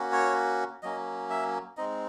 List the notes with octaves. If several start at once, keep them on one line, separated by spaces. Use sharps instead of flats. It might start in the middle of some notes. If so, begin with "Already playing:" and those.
Already playing: A#3 C#4 F#4
C#5
F#3 A#3 C#4 D#5
E5
G#3 C4 D#4 D#5